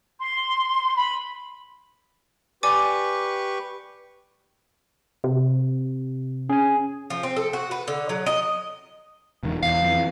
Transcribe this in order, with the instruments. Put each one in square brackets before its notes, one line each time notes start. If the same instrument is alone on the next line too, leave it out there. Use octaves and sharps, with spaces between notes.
[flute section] C6
B5
[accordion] G4 B4 C#6 [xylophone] D5 G#5 D6
[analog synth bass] C3
[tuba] C#4 [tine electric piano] G#4 G#5
[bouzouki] F3
C4
A4
F#4
B4
D3
F#3
D#5
[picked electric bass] E1 C#2 D#3
[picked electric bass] E2 [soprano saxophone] F5
[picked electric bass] F2 E3